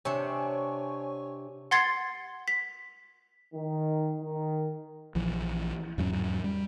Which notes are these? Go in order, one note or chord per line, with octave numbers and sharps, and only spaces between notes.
C3 D4 C#5 G#5 C#6
F#5 C6 G#6 A6 C7
B6
D#3
D#3
A#1 E3 F3
E2 G#2 F#3 C#4
G3